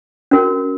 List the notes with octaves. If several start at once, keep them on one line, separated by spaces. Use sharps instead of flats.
C#4 F#4 A#4